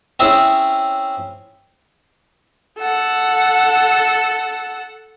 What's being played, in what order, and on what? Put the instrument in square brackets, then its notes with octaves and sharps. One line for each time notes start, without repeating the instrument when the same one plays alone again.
[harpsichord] C4 C#4 E4 G#4
[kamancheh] A4 F#5